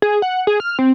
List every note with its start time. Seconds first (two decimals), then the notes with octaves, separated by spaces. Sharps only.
0.02 G#4
0.22 F#5
0.47 G#4
0.60 F6
0.79 C4